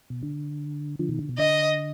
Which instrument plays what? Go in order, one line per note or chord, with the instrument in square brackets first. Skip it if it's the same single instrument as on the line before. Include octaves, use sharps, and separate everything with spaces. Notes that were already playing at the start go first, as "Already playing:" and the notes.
[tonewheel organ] B2
D3
D3 F3
B2 D#3
D3
B2
[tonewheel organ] D3 [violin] D#5